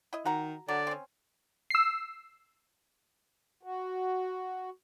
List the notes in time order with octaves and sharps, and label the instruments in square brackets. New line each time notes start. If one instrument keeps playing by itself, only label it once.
[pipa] E4 D#5
[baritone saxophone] D#3 [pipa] F#4 F#5 A#5
[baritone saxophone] D3 [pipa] F#3 [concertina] D5
[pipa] C4 C#4
[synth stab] E6 C7
[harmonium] F#4